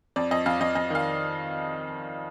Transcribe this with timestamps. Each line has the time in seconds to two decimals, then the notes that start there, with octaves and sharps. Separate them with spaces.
0.16 F2 D5
0.31 F2 D#5
0.46 F2 F5
0.61 F2 D#5
0.75 F2 D#5
0.90 D#3 F5